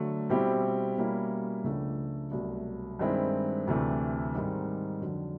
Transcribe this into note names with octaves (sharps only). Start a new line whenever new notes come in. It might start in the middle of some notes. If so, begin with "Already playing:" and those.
Already playing: D3 F#3 A3
B2 G3 C4 E4 G4
B2 G3 A#3 C#4 E4
C#2 C#3 F3 A3 D4
C2 B2 F#3 A3
G2 D#3 G#3 C4 E4
D2 C3 E3 A3
G#2 D#3 G3 C4
F2 D3 F#3